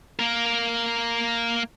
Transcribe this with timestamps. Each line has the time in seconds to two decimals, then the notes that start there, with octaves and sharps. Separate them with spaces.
0.19 A#3 A#4